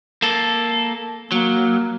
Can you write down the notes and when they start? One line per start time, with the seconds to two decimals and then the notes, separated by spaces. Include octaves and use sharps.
0.22 A#3 A4
1.32 F#3 A#3